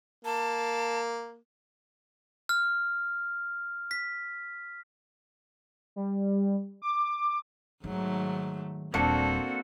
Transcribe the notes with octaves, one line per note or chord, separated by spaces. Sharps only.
A#3 A5
F6
B6
G3
D6
G#2 D#3 F#3 A3
D#1 A#3 C4 D4 F#4 A4